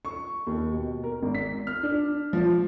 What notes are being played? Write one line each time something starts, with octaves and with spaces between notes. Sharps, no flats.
C#6
D#2
B2
A#4
G#1
B6
F6
D4
F3